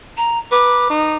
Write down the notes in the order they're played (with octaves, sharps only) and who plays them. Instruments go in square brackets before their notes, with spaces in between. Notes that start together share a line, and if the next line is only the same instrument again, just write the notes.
[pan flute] A#5
[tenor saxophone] B4 [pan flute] D6
[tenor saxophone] D#4